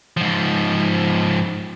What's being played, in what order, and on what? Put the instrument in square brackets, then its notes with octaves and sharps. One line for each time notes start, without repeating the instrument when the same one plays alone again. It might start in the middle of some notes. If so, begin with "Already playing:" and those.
[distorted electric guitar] G#2 F3